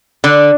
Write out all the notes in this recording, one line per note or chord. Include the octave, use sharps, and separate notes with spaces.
D3